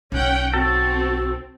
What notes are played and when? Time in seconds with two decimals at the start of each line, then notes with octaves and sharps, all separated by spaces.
0.12 B1 C#4 F#5 G5
0.54 C4 F#4 A4